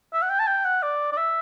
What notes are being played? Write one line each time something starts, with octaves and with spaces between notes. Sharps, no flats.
E5
F#5
G5
A5
G5
F#5
D5
D5
E5